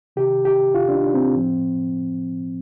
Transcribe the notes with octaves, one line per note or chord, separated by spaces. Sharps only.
C3 D#3 G4
G4
F4
D4
D#4
D4
C4
A2 F3